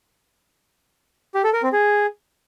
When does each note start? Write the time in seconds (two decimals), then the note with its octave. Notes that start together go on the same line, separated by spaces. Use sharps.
1.35 G4
1.44 A4
1.53 A#4
1.63 C4
1.72 G#4